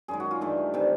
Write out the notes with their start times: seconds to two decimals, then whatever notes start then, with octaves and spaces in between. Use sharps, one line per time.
0.08 F#2 D#3 G#3 G#4
0.20 F#4
0.31 F4
0.41 G2 E3 A3
0.74 C3 D#3 G3